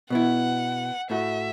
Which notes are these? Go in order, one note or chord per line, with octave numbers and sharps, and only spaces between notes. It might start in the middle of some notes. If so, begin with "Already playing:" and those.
B2 B3 E4 F#5
A2 A3 F#4 E5